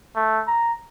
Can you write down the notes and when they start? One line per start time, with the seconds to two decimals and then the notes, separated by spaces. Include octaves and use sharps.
0.16 A3
0.48 A#5